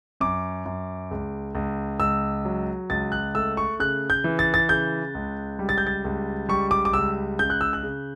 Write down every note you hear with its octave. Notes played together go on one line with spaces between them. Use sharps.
F#2 D6
F#2
C#2
C#2
C#2 E6
F#3
C#2 A6
F#6
A3 E6
C#6
C#3 F#6
G6
E3
A6
A6
C#3 G6
C#2
G3
A6
G6
A6
C#2
G3 C#6
D6
D6
C#2 E6
C#3 G6
F#6
E6
F#6
C#3